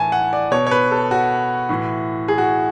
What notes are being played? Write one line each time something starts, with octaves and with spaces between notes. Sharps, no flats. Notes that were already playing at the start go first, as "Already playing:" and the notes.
Already playing: A2 E3 G#5 A5
F#5
D5
B2 C#5
C#5
B4
A4
F#4
A2 E3
G#4
F#4